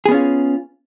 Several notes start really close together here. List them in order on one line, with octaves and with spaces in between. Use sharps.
G#4 B3 C#4 F4